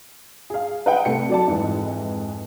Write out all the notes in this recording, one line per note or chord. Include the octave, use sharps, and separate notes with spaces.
G#4 F5
B4 D#5 F#5 G5
C2 A3 C#7
F#3 D5 A5
F2 G#2 E3